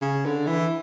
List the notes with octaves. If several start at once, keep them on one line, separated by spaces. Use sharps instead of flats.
C#3
D3
E3